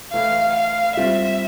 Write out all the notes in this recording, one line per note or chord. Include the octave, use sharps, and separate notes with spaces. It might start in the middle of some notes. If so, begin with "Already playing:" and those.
E3 A3 E4 B4 F5
F5
G3 C4 F4 E5